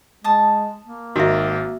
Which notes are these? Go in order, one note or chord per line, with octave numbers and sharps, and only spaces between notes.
G#3 A5 D#6
A#3
G#1 D#3 F#4 E5